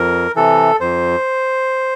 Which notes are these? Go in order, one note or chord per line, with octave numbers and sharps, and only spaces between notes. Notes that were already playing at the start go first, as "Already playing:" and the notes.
Already playing: F2 A#4
C3 E3 A4
F2 C5